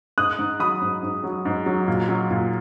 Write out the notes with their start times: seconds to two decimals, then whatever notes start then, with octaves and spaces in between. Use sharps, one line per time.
0.18 G#2 D#6 F#6
0.39 G#2
0.60 F#3 B5 D#6
0.82 G#2
1.03 G#2
1.24 F#3
1.45 G#2
1.66 F#3
1.88 A#2
2.09 F#3
2.31 A#2